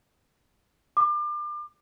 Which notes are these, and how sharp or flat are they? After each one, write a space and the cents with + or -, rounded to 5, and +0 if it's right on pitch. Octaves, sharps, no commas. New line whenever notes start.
D6 +35